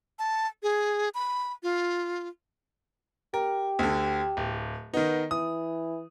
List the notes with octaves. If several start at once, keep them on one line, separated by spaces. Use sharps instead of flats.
A5
G#4
B5
F4
G4 A#4
D2 D3
D1
D#3 B3 D#4
E3 D#6